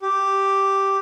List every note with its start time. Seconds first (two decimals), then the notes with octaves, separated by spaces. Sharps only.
0.02 G4